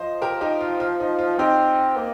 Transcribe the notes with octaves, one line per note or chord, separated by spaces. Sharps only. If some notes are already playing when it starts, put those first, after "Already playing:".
Already playing: F3 C5 D#5
G4 A#4
D#4 G4
F4
F4
D#4
F4
C4 D#4 G4
A#3